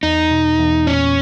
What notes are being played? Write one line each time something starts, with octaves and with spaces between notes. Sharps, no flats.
E2 D#4
B2
E2
A#2 C#4